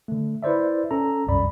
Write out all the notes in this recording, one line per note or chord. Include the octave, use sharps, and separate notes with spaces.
D3 A3
E4 B4 C5 D5 E5
C#4 A4 A#5
G1 C2 F#2 D5 B5